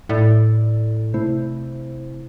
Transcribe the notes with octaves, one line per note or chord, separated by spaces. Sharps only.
A2 A3 E4 A4 D5
C3 A3 E4 C5